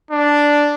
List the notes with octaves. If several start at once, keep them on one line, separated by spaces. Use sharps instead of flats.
D4